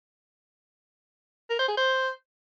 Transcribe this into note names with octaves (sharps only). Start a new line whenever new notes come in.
A#4
C5
G#4
C5